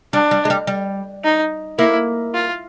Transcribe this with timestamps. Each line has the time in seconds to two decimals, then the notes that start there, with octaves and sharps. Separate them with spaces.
0.13 G3 D4
0.31 G3
0.45 G#3
0.50 G3
0.67 G3
1.24 D#4
1.78 A#3 E4
2.34 F4